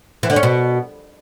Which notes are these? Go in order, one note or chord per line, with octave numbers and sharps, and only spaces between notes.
E3
D3
C#4
B2